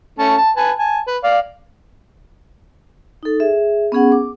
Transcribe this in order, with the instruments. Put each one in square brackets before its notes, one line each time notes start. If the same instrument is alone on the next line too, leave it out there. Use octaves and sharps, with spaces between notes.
[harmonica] A3 C#4 A5
A5
B4 G#5 A5
G#5 A5
B4
D5 F5
[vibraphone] D#4 A4
G#4 E5
B3 C#4 G#4 F#5
D6